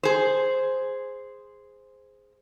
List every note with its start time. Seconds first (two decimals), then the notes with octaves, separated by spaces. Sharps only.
0.03 G#4 C5